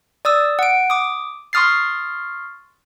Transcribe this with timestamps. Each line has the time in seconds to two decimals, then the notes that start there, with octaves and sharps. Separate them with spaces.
0.25 D5 D#6 E6
0.59 F#5 D7
0.90 D6 D#6
1.53 C6 C#6 D#6 F6 A6 C7